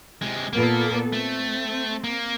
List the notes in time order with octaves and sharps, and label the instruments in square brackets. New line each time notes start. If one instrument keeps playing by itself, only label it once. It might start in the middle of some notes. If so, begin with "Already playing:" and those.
[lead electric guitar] C3 G#3
[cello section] A#2 B3 A4 [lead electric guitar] A#3
[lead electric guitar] A3 [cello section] C4
[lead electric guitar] A#3